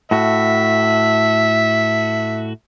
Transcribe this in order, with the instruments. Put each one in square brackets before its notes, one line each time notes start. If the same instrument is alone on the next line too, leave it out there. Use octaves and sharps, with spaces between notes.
[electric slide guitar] A2 F#4 [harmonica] E5